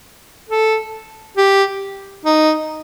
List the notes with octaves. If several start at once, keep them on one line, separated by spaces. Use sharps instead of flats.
A4
G4
D#4